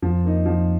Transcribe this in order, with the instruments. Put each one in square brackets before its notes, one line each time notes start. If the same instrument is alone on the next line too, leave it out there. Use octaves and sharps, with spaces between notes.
[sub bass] F2 [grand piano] F3
[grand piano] A#3 D#4
F3